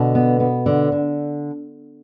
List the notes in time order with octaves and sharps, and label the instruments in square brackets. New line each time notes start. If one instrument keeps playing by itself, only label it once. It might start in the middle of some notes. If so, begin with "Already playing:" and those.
Already playing: [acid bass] B2 [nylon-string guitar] D3
[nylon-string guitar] B3
B3
D3
D3